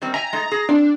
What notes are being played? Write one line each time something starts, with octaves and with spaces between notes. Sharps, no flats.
D#3 G3 C4
E5 G5 G#5 A#5
G#3 A3 D#4
G#4
C4 D4